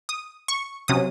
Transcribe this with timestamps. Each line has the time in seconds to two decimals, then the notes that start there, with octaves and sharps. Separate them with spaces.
0.09 D#6
0.48 C#6
0.88 C3 F#3 C#4 D#6